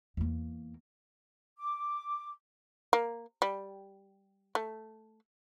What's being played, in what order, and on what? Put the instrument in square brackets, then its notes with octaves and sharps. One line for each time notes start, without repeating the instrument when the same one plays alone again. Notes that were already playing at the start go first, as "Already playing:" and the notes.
[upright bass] E2 A#3
[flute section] D6
[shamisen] A#3
G3
A3